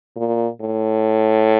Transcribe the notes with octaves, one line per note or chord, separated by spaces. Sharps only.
A#2
A2